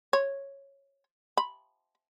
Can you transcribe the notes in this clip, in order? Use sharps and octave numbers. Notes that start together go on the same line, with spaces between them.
C#5
B5